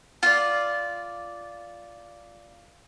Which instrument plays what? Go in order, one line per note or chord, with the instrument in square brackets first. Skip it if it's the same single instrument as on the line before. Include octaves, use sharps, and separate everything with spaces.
[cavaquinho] F4 D5